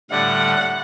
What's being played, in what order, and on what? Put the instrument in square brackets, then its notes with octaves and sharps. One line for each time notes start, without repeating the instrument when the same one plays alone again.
[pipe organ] A2 D3 G3 [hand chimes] D4 D5 E5 [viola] F#5